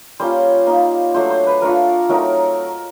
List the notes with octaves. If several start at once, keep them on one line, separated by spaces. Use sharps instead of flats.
G3 A#3 C#4 F4 C5
A#3 D#4
F#3 A3 D4 C5
C5
B4
A3 D4 F4 A#4
F#3 A3 C4 D#4 A#4